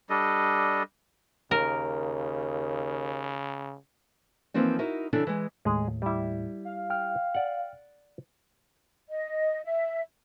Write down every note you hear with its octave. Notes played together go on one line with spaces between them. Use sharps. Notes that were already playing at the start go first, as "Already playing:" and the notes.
G3 D4 A4 D#5
D#2 C#3 A#4
E3 F3 A#3 C4 D#4
D#4 E4 F#4 A#4
C#3 E3 D4 E4 A4
E3 G#3
D#2 A2 G#3 G#4
G3 E4
F5
G5 F6
D5 F#5
D#5
E5